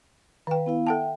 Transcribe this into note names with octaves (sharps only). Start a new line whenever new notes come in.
D#3 B4 F5 G5
B3 E4 F5
A4 E5 F#5 G5 A5